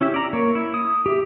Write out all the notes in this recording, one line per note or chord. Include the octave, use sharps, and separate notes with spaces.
C#4 E4 G4 E5
D5 A#5
A#3 C#5
E4
D#6
G4 E5